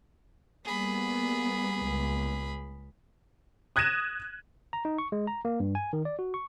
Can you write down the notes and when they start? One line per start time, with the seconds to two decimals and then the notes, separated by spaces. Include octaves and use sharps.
0.65 G3 A#3 B3 G#4 B5
1.80 C#2
3.76 D#6 F#6 G#6 A#6 D#7 E7
4.73 A#5
4.85 D#4
4.98 C#6
5.12 G#3
5.27 A#5
5.45 A#3
5.60 G2
5.75 G#5
5.93 D#3
6.05 D5
6.19 F#4
6.34 C#6